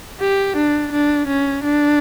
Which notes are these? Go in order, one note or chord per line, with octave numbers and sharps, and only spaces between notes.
G4
D4
D4
C#4
D4